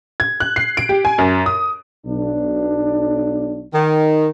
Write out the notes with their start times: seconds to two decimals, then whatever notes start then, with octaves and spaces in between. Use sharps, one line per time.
0.20 G#6
0.40 F#6
0.56 C7
0.77 D7
0.89 G4
1.05 G#5
1.18 F#2
1.46 D#6
2.06 B1 D4
3.73 D#3